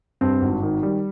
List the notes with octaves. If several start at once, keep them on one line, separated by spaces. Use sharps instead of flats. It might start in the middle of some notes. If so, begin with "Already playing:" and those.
G2 C4
G#1
D#3
G3